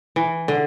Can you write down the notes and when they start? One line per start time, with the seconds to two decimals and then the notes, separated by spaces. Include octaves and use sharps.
0.16 E3
0.48 D3